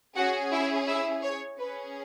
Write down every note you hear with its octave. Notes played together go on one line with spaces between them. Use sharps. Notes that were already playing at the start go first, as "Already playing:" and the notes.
C#4 F#4 G#4 F#5
E4 E5
E4 E5
C#5
C#4 G#4 B4